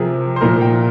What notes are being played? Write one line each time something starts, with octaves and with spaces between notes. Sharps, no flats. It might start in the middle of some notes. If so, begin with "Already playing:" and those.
Already playing: C3 F3 G#4 A#4
C5
A#2 F3 A#4
G5